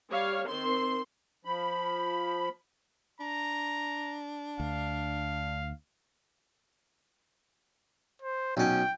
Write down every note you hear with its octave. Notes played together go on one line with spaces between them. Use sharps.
G3 C#5 F5
D#3 C4 C6
F3 B5
D4 A#5
D2 F5
C5
B1 C#4 G5